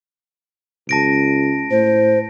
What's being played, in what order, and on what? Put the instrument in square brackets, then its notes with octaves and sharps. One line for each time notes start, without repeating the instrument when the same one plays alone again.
[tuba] C#2 [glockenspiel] A5 A#6 D7
[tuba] A2 [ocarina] C5